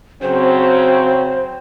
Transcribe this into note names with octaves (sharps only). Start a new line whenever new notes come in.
C#3 F#3 C4 C5